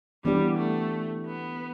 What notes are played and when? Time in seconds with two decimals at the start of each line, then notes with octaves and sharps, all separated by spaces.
0.24 E3 G3 B3 D4 G4
0.58 A3
1.26 B3